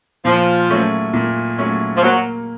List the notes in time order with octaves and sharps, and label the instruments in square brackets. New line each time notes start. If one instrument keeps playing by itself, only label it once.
[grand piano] A#2 [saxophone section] F3
[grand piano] F#3 A3 C#4
A#2
F#3 A3 C#4
[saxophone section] F3
[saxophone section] F#3 [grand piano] A#3